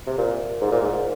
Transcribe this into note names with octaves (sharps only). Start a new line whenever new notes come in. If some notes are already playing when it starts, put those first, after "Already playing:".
C3
A#2
G#2
A#2
G#2